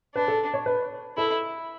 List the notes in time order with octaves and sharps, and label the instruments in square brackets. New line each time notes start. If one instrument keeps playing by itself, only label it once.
[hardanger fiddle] D4 [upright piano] B4
[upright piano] A4
C#5
B4
[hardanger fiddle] E4 [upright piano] A4